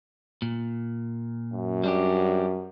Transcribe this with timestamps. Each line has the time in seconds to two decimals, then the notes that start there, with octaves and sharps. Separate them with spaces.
0.42 A#2
1.54 F#2
1.84 G3 D4 G4